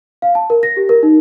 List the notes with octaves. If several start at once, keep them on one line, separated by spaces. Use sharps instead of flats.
F5
A5
A#4
A#6
G4
A#4
D#4